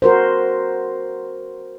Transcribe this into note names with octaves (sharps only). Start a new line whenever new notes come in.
F#4 A#4 C5